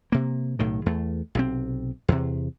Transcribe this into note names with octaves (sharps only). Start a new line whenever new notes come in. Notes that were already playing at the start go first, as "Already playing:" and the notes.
C3 A#3
B1 A2 D#3
E2 A3
B1 C3 C4
E2 C3